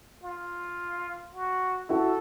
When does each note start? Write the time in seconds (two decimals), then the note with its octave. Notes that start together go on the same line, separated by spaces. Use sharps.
0.23 F4
1.34 F#4
1.89 E4 F#4 A4